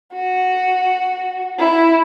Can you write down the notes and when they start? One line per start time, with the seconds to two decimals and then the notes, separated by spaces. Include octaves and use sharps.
0.13 F#4
1.58 E4